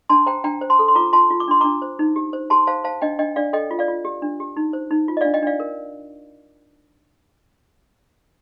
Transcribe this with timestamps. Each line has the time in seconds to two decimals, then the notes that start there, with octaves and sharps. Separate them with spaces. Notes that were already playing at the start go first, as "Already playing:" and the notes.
0.09 D4 A5 C6
0.26 C5 G5 A#5
0.44 D4 G5 A#5
0.61 C5
0.70 A5 C6
0.79 A4
0.88 C6
0.95 F4 A#5 D6
1.13 F4 A5 C6
1.30 F4
1.40 D6
1.48 D4 C6
1.61 D4 A#5 D6
1.82 C5
1.99 D#4
2.16 G4
2.33 C5
2.50 G4 A5 C6
2.67 C5 F5 A5
2.84 C5 F5 A5
3.01 D4 D#5 G5
3.19 D4 D#5 G5
3.36 D4 D5 F5
3.53 A4 D#5 G5
3.71 F4
3.79 D5 F5
3.88 F4
4.05 G4
4.22 D4
4.40 G4
4.57 D#4
4.73 C5
4.91 D#4
5.08 F4
5.17 D#5
5.21 D4 D5 F5
5.34 D#5 G5
5.43 D4 D5 F5
5.60 A#4